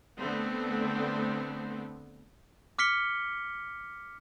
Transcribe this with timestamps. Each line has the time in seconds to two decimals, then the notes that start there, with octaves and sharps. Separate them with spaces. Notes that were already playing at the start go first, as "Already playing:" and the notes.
0.17 D3 A3 B3 C4
2.79 D6 F6 B6 C#7 G7